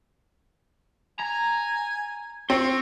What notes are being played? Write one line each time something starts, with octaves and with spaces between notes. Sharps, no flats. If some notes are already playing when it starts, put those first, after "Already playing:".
G#5 A#5
C4 F4 C#6